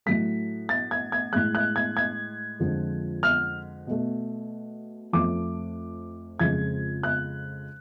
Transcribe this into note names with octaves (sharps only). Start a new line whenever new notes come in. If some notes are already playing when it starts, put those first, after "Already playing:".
A2 F#3 A3 B6
A6
G#6
G#6
A2 G#3 F#6
F#6
G#6
G#6
F2 D3 F3 G#3
F6
B2 A3
F2 F3 A3 D6
F2 C#3 F3 G#3 G#6
F#6